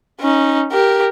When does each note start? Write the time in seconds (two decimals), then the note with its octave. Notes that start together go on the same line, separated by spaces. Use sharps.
0.20 C#4 D#4
0.72 G4 A#4